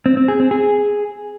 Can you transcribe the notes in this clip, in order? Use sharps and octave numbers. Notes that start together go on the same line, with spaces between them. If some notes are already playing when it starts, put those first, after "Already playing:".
C4
C4
G#4
C4
G#4